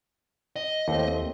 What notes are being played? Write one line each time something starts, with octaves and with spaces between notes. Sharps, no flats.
D#5
D#2 E3 A3 C4